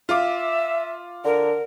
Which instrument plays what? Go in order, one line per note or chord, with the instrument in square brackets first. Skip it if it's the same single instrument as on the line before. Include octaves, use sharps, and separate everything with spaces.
[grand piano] F4 F5 D6 [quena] E5
[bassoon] D3 [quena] A#4